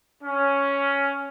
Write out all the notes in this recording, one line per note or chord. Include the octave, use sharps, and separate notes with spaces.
C#4